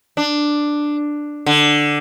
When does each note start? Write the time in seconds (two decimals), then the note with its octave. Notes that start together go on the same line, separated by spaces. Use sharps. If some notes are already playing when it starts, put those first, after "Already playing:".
0.17 D4
1.46 D3